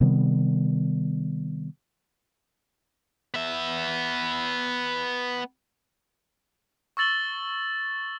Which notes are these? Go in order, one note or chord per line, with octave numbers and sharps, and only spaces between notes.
C3 D#3 G3 B3
B3 E5
C#6 E6 A6 F#7 G7